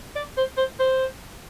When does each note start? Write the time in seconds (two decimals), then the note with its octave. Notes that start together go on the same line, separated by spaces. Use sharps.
0.16 D5
0.37 C5
0.57 C5
0.79 C5